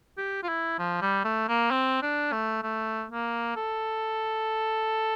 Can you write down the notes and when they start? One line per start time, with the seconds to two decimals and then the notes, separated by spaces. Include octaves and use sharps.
0.17 G4
0.43 F4
0.49 E4
0.79 F3
1.02 G3
1.24 A3
1.49 A#3
1.71 C4
2.02 D4
2.32 A3
2.63 A3
3.10 A#3
3.56 A4